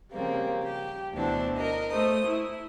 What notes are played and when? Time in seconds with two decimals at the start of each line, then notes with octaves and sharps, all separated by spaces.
0.13 C#3 F3 G3 A#3 C4
0.65 G4
1.13 D2 B2 D3 E3 D4 C5
1.58 A#4 D#5
1.93 A3 C5 D#6
2.28 E4